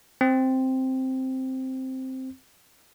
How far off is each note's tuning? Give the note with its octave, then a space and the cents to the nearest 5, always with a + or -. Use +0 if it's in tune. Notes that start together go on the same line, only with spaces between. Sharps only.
C4 +0